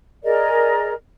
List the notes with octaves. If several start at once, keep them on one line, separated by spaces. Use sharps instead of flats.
G#4 A#4 D5 D#5